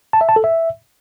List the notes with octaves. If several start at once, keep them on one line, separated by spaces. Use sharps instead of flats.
A5
E5
A5
A4
E5